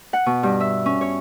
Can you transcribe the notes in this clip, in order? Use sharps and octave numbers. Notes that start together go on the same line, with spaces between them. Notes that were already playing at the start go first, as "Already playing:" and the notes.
F#5
B2
G2
E5
C#4
C#5